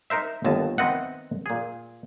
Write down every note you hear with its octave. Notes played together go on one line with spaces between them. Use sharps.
D#4 A#4 C5 E5
G1 D#2 D#5 A5
D#3 B3 C4 D#5 E5 F#5
A#2 G#4